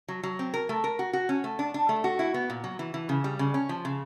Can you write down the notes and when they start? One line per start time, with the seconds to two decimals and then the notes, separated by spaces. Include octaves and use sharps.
0.08 F#3
0.23 F#3
0.39 C4
0.54 A#4
0.69 A3
0.84 A#4
0.99 F#4
1.13 F#4
1.29 C#4
1.44 A3
1.59 D4
1.74 D4
1.89 A3
2.04 F#4
2.19 E4
2.34 B3
2.50 A#2
2.64 F#3
2.79 E3
2.94 E3
3.09 C#3
3.24 G3
3.39 C#3
3.54 C#4
3.69 F3
3.85 C#3